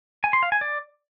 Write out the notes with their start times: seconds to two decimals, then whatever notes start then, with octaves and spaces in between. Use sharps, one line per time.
0.24 G#5
0.33 C6
0.43 F5
0.52 G#5
0.61 D5